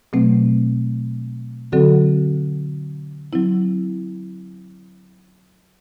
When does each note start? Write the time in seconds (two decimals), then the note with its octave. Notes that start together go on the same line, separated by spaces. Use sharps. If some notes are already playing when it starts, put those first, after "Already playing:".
0.13 B2 F#3 A3 C4
1.72 D3 F#3 C4 F#4 A4
3.33 F#3 C4 E4